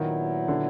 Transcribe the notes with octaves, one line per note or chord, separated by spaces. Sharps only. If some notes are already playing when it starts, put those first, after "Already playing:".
Already playing: A#2 D#3 F#3 B3 E4
D3